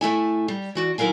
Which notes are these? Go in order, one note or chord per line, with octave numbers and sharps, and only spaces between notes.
A2 A3 E4 G#5
G3
E3 F#4 D5
D#2 F#3 E4 A#4 F5 G#5